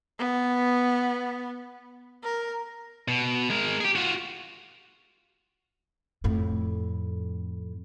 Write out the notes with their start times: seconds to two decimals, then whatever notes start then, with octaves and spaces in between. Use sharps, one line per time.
0.19 B3
2.23 A#4
3.08 B2
3.50 G#3 A#4
3.81 G4 G#4
3.96 F4 F#4
6.24 F2 A2